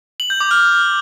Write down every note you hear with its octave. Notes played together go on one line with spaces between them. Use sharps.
F#7
G6
D6
F6